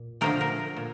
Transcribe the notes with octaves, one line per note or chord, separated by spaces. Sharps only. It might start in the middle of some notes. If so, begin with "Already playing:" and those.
Already playing: A#2
D3 F3 A3 A#4
A#4
A#2